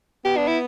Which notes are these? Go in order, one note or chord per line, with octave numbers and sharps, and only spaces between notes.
B3 G4
D4
E4